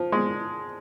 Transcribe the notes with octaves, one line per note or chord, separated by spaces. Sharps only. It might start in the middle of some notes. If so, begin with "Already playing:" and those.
Already playing: F3
G#3